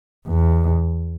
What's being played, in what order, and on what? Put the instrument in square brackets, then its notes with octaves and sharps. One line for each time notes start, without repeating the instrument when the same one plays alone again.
[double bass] E2